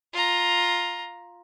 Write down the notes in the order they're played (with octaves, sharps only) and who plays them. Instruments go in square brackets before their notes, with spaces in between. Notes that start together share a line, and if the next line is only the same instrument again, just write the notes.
[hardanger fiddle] F4 A#5